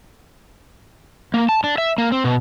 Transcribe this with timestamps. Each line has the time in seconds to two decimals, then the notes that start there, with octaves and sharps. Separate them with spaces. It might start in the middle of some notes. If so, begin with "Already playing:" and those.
1.34 A#3
1.49 A5
1.64 D4
1.78 E5
1.98 A#3
2.12 C4
2.24 B2